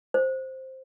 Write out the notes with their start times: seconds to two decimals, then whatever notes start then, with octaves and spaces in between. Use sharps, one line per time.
0.14 C5